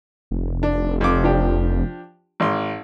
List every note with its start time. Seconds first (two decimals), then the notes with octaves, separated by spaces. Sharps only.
0.31 F1
0.63 D4
1.01 F2 D6
1.23 F3 D4 G4
2.40 G#1 C6